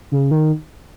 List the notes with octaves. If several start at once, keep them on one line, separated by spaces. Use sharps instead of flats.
C#3
D#3